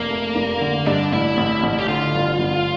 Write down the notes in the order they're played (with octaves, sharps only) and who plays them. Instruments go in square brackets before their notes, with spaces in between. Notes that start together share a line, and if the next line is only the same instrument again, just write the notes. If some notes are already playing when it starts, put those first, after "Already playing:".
Already playing: [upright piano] F1 [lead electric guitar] A#3
[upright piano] A3
F1
D3
[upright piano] G2 [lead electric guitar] D4
[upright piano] A1 [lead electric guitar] E4
[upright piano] A1
A1
[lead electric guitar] G4
[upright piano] D3 [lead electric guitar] F4
[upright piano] G1
G1